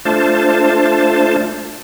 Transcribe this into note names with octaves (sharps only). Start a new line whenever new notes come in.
A3 D4 F4 C5 A5